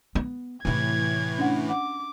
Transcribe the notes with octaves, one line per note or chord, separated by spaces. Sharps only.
B3
A2 C3 E3 E4 G#6
C#4 D4 F#5
F#5 D6